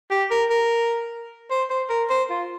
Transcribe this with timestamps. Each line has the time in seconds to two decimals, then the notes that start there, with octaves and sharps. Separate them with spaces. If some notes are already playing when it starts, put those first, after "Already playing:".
0.11 G4
0.31 A#4
0.50 A#4
1.51 C5
1.70 C5
1.90 A#4
2.10 C5
2.30 F4